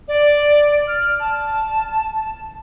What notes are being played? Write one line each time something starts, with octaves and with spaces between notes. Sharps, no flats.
D5
F6
A5